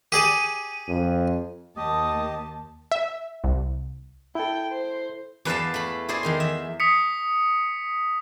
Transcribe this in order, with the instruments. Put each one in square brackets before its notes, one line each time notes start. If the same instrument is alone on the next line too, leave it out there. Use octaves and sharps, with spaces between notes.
[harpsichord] G4 G#4 D5 [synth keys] D#7
[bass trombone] F2
[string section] D#2 [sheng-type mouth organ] G4 D#5 [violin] A5 [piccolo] D#6
[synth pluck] E5
C2
[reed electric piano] E4 A4 [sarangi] G5
[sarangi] C5
[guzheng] E2 B4 D5 F5 A5
A3 B5
E4 G#4 C5 D5
E2 D#3 C6
E5
[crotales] D#6 B6 C#7